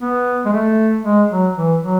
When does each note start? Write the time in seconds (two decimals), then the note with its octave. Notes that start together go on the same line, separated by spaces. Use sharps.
0.02 B3
0.45 G#3
0.53 A3
1.03 G#3
1.30 F#3
1.55 E3
1.81 F#3